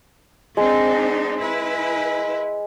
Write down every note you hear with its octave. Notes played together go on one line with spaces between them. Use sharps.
G#3 C4 D4 D#4
E4 B4